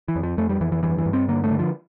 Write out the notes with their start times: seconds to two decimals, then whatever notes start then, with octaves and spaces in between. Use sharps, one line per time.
0.08 E3
0.16 F2
0.23 F3
0.37 F2 A3
0.49 G3
0.61 F2 E3
0.72 E3
0.83 G2 E3
0.98 E3
1.06 G2
1.13 C4
1.28 D3 A#3
1.44 A3
1.51 D3
1.59 F3